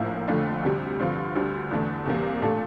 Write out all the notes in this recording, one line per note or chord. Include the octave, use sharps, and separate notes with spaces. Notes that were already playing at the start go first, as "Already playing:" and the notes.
Already playing: A#1 A2 F3 A#3 E4
F2 D3 A3 D4 F4
D2 C3 G3
G2 D3 F3 C4 F4
D2 D3 G3 D4
E2 D3 A3 D4
E2 C3 G3 A#3
A#2 A3 D4 A4